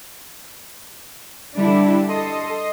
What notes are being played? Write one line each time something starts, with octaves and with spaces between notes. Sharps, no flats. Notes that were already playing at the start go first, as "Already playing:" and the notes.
D3 G3 D4 E4
A4 D#5 C6 D#6